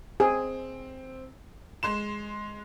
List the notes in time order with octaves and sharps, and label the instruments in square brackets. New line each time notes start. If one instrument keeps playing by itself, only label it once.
[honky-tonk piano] C4 [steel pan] G#4
[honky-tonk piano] G#3 C6 E7